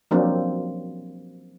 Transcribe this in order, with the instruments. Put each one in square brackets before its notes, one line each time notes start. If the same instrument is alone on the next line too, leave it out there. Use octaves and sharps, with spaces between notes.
[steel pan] F3 F#3 A#3 C4 D4